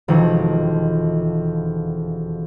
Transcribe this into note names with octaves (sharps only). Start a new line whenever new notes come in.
E1 F2 D#3